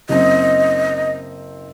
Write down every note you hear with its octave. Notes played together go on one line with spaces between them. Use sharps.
F#1 C4 D#5